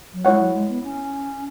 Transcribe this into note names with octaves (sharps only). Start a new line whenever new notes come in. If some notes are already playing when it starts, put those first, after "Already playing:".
F#3
G#3 E4 C#5 F#5
F#3
G#3
B3
C#4